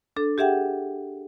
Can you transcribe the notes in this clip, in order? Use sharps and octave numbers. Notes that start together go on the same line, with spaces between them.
D4 A4
G4 G#4 E5 F#5 G5